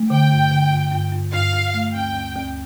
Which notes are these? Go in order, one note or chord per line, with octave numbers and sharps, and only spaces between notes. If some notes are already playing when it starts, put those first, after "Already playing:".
Already playing: A3
D3 G5
G2
D3
G2
G2
G2
G2 F5
G2
A3
D2 G5
D2
D2